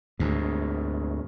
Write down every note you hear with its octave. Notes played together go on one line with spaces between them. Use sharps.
D2 G#2